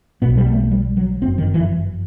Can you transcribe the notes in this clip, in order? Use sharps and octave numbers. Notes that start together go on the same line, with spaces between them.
B1 B2 B3
G3
A3
G3
F#3
G1 F#2 C4
D#3
E3